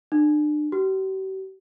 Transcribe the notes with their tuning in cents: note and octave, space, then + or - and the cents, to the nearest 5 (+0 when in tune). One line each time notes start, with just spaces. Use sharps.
D4 +35
G4 -45